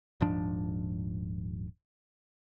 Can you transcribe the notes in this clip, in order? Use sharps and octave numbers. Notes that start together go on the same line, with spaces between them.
D#1 G#2 F3 D4